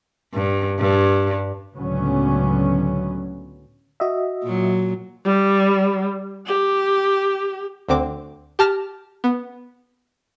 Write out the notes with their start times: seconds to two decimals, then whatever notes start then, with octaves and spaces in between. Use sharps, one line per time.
0.34 G2
0.79 G2
1.75 C#2 A2 D3 F#3 B3 C#4
4.00 F#4 D#5 E5
4.44 A#2 F#3
5.25 G3
6.47 G4
7.89 D2 D3 C4 D6
8.59 G4 A5 F6 A#6
9.24 B3